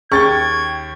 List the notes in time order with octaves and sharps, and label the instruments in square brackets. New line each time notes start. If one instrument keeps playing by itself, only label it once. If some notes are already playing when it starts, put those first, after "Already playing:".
[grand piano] D#2 A6 [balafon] C#4 G#4 [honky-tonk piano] G5 C#6 [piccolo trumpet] G#6